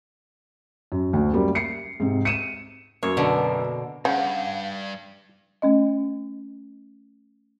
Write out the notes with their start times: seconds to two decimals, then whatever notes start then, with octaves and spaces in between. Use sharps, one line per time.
0.92 F#2
1.13 D2
1.33 F#2 G3 A#3
1.55 C7 C#7
2.00 G#2 C3
2.25 C#7 D#7 E7
3.03 F#2 A#3 C#5
3.17 B2 D3
4.05 G2 C#3 F5 F#5 G6
5.62 A3 C#4 D#5